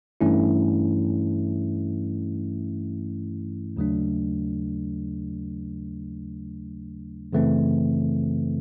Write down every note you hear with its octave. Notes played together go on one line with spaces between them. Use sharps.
G2 E3 A3 C#4 E4
D#2 C#3 F#3 A3 D4
F#2 C#3 E3 A3 C4